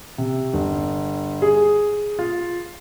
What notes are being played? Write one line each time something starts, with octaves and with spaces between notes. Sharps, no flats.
C3
G1
G#4
F4